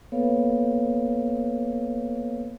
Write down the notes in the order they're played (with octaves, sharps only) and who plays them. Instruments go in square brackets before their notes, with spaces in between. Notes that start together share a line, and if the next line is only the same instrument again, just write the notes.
[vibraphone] A#3 B3 A4 B4 C#5 F5